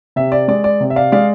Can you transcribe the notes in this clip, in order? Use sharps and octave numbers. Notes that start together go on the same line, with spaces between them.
C3 E5
D5
G#3 D5
D5
C3
E5
D5 F5
G#3 D5 F5